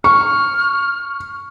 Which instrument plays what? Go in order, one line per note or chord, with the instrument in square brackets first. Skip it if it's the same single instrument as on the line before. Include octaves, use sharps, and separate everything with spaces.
[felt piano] C#6 [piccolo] F6